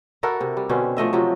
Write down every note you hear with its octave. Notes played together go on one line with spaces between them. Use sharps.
E4 F#4 A4 A#4
C3
G3
B2 D3 C4 C#4
F3 A3 D#5 E5
C3 F3 F#3